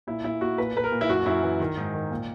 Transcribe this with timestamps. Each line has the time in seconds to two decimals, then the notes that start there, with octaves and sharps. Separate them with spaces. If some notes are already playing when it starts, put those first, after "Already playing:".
0.07 A#2 E4
0.24 A#2 E4
0.41 A#2 F#4
0.58 A#2 B4
0.75 A#2 B4
0.84 A#4
0.92 A#2
1.01 E4
1.09 F#2 F#4
1.26 F#2 E4
1.43 E3
1.60 D#3
1.77 G#2
1.93 D#3
2.11 A#2